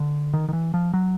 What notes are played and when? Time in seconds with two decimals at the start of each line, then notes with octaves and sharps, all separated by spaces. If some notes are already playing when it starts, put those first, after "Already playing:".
Already playing: D3
0.34 D#3
0.49 D#3
0.53 E3
0.74 F3
0.94 F#3